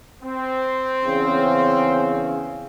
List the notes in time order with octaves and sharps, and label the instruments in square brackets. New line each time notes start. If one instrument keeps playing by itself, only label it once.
[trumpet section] C4
[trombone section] E2 C#3